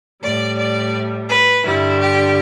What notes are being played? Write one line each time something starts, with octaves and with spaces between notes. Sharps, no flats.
A2 G3 D5
D5
B4
G2 D3 G3 E4
G4